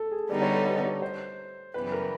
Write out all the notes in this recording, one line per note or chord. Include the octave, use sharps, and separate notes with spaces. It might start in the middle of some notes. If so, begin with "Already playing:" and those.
Already playing: A4
G#4
D3 G3 B3 D#4 D5
C#5
A4
D#5
C#5
C5
F#2 C#3 E3 G3 B3 B4
A#4